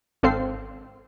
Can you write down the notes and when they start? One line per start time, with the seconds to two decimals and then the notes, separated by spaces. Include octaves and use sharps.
0.23 G#1 C4 A4 C5 F5 C7